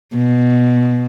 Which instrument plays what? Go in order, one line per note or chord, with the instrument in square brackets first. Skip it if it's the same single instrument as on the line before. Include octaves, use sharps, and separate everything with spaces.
[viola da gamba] B2